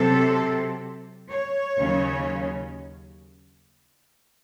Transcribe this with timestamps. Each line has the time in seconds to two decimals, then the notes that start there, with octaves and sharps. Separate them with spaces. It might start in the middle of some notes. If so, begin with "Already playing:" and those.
Already playing: C3 F#3 C4 A4
1.30 C#5
1.78 D#2 C#3 F#3 C#4